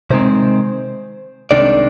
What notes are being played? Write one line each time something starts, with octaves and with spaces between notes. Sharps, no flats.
C3 D#3 G#3 C4 C5
C2 C3 D#3 G#3 D4 D5